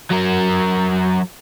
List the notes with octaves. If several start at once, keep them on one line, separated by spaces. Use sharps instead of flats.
F#3 A#4